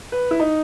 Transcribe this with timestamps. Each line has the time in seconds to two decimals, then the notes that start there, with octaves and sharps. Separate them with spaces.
0.12 B4
0.31 E4
0.40 D#4